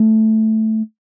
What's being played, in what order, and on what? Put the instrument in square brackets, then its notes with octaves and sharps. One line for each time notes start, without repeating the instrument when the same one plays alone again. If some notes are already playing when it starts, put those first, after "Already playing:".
Already playing: [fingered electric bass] A3